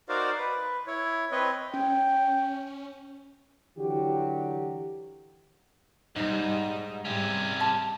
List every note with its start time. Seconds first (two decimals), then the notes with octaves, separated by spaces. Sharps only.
0.09 D#4 F#4 A#4 C5 D5 F5
0.38 B4
0.87 E4 C#5
1.31 C4 B4 C#5 D#5
1.74 C#4 G5
3.77 D3 E3 F#3 F#4 G4
6.16 G#2 G3 D#4
7.05 G#2 C3 G3 C#4
7.60 A5 C6